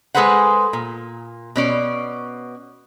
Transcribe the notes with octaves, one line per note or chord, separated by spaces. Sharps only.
G#3 G#4 A4 B4 C5 F#5
A#2
B2 C#4 D5